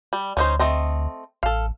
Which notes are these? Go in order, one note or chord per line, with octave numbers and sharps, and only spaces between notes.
G3
D2 C#4 D#4 C5
A3 C4 D#5
A1 A4 F5